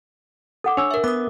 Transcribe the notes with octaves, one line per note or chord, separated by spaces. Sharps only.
A4 F#5 D6
D4 C#5 E6
A#4 E5
B3 D6 D#6